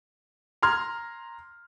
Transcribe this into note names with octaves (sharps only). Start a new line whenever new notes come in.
A#5 C6 F6 G#6